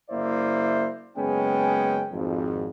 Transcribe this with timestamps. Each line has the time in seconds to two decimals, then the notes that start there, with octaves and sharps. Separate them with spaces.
0.10 F#1 A#3 E4 C5 D5 E5
1.17 F#1 G#3 B3 C#4 G5
2.12 G#1 F2